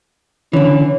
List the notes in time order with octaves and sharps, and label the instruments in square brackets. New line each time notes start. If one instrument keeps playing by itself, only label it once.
[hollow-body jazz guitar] D3 E3 [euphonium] C#4